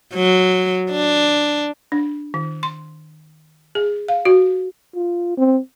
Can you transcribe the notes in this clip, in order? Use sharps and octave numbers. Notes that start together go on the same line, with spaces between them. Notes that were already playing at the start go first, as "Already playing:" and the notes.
F#3
D4
D4
D#3
C6
G#4
F5
F#4
F4
C4